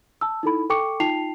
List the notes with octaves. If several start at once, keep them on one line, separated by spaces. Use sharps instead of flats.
A5 E6
D#4 E4 A4 B5
A4 G5 C#6 D6 C#7
D#4 F4 G5 A5 C7 F7